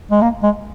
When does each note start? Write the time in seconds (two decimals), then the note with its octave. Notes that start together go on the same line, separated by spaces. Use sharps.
0.11 G#3
0.22 A#3
0.43 G#3